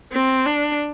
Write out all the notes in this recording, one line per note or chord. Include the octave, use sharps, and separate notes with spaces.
C4
D4